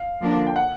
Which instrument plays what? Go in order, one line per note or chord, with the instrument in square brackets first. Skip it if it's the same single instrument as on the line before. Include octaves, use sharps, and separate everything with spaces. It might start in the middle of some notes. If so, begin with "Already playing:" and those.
Already playing: [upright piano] F5
[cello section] D3 F3 A#3 D4
[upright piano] G5
F#5